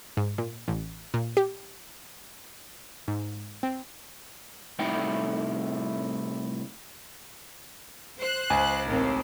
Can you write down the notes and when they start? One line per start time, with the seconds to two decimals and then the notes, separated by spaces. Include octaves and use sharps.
0.17 G#2
0.38 A#2
0.68 A1
1.14 A#2
1.37 G4
3.08 G#2
3.63 C4
4.79 C2 A2 D#4 E4 F#5 G5
8.19 C5 F#6
8.50 C#2 G#5
8.87 A1 D#2 C4